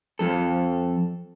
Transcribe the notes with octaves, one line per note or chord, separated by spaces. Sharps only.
F2 A4